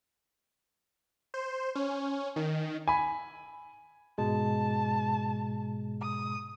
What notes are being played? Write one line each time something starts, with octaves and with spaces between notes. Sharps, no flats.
C5
C#4
D#3
G#5 B5
G#2 B2 G#3 A5
D#6